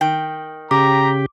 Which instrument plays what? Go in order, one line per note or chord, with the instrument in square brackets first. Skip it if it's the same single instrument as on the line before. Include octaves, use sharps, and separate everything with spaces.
[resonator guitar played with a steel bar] D#3 G5
[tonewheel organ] C#3 G4 [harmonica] A#5 [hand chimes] D6